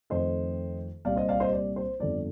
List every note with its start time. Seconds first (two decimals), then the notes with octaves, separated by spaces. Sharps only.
0.10 F2 D#3 A3 C5 D#5
1.05 C2 A#2 G3 C4 D5 F5
1.16 C5 D#5
1.28 D5 F5
1.40 C5 D#5
1.53 D5
1.76 C5
2.00 G1 F2 D3 F3 D5